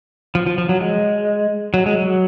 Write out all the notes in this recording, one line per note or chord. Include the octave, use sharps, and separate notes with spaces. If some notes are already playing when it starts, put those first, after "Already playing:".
F3
F3
F3
F#3
G#3
F#3
G#3
F#3